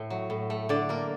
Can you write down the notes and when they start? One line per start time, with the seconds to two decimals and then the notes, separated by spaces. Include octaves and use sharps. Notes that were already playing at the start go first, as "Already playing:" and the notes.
Already playing: A2 A3
0.10 F#3
0.30 A2
0.50 A3
0.69 D3 D5
0.89 A#3 A#4